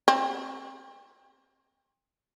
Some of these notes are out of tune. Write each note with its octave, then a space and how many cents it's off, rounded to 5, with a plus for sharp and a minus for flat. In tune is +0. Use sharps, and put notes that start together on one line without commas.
C4 +30